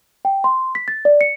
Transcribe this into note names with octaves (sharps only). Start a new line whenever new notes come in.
G5
C6
B6
A6
D5
C#7